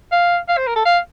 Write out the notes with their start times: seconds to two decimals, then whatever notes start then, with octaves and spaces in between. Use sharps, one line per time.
0.12 F5
0.48 F5
0.57 C5
0.67 A#4
0.76 A4
0.86 F5